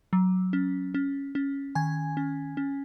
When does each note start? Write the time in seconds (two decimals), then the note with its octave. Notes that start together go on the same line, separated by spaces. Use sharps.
0.13 F#3
0.53 C#4
0.94 C#4
1.35 C#4
1.75 D#3 G#5 G#6
2.17 C#4
2.57 C#4